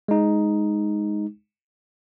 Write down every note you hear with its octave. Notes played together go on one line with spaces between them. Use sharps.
G#3 D#4